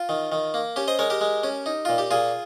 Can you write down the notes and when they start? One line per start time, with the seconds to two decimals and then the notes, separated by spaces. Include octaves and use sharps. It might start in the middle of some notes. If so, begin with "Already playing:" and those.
Already playing: F4
0.09 D#3
0.32 D#3
0.54 A#3
0.76 C#4 G4
0.88 C5 D#5
0.99 G#3 A#4 C#5
1.10 G4 A#4
1.21 G#3
1.43 C#4
1.66 D#4
1.85 A#2 F4
1.98 G4
2.11 A#2 F4 G#4